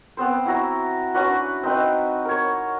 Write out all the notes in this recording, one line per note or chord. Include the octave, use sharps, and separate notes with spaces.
B3 C4 C5
E4 F#4 A#5
C#4 D4 F#4 B4
C4 D#4 B4
A#4 C#5